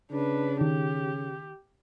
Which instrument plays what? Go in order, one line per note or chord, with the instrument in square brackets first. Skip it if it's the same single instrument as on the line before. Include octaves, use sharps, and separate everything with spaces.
[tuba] C#3 [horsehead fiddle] D4 B4
[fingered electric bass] D#3 [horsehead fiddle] G4